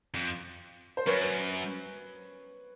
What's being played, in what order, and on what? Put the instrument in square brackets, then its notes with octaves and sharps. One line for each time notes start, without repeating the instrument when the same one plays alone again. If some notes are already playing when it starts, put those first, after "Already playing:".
[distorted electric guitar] F2
[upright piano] C5
[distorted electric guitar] F#2 [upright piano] B4 C#5